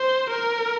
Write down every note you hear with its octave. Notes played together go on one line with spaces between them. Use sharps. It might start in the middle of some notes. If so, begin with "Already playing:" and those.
Already playing: C5
A#4